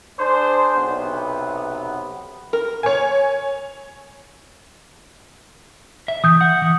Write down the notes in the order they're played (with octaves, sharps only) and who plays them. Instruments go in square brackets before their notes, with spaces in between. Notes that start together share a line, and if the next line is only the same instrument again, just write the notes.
[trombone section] D4 G#4 C5
B1 C3 B3
[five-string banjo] A#4
[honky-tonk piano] C#5 G#5
[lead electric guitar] E5
[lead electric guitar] E3 [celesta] D#6 G6
[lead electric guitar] F#5
E3